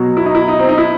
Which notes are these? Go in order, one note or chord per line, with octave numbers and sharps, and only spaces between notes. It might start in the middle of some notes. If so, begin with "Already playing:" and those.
Already playing: B2 F#3
E4
D#4
E4
D#4
C4
D#4
E4